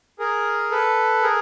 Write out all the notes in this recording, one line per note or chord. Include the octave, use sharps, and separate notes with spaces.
G#4 A#4
A4 B4
G#4 A#4